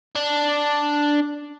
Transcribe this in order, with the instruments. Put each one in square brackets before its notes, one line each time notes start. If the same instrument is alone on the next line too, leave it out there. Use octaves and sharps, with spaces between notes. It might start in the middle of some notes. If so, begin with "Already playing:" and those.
[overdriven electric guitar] D4